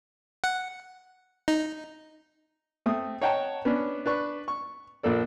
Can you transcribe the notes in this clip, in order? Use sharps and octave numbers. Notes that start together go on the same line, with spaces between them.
F#5
D#4
A3 C4 D#6
C#5 D#5 F#5 G5 A5 A#5
B3 C#4 D4
D4 B4 C#6
C#6
A#1 A#2 A#3 A4 D5